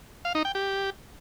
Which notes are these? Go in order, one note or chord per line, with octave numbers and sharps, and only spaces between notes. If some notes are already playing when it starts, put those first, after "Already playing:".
F5
D#4
G5
G4